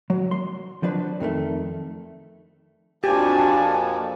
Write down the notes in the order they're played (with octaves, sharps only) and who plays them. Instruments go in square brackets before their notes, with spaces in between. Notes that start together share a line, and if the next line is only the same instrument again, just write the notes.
[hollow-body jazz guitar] F#3
C6
F3 F#3 D4 B4
F2 D#3 G#3 A3
[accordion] F2 A#2 F3 [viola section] D4 F#4 A5 [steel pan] G4 [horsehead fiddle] G#5